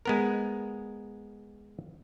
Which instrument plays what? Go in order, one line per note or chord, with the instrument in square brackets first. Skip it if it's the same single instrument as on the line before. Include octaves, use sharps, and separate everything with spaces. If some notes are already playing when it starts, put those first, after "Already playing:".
[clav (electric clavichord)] G#3 B3 A#4